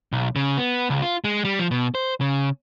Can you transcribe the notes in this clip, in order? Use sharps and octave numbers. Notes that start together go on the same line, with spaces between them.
B1
C#3
B3
C#2
F4
G#3
G3
F3
B2
C5
C#3